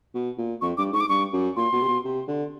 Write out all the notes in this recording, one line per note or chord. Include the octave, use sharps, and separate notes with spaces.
B2
A#2
F2 C#6
G2 D6
G#2 C#6
D6
G2 C#6
F#2
A#2 C6
B2
C3
B2
C3
D3